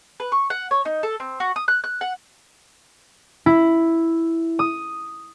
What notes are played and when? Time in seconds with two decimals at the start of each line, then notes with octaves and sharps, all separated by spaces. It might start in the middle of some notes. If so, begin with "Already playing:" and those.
0.20 B4
0.32 C#6
0.50 F#5
0.71 C#5
0.85 D#4
1.03 A4
1.20 C4
1.40 F#4
1.56 D#6
1.68 F#6
1.84 F#6
2.01 F#5
3.46 E4
4.59 D#6